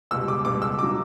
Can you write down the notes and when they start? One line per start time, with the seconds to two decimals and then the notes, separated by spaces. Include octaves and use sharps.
0.11 C#2 B2 G3 E6
0.28 D6
0.45 C#2 B2 G3 D6
0.62 E6
0.79 C#3 F#3 D6